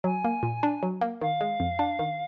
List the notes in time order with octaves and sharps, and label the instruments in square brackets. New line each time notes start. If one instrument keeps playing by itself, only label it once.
[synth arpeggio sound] F#3 [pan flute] G#5
[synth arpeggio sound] A#3
A#2
D4
F#3
A#3
[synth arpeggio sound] D#3 [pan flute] F5
[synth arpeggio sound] G#3
F2
D4
D#3